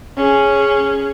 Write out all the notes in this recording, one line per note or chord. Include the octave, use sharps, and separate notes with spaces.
C#4 G#4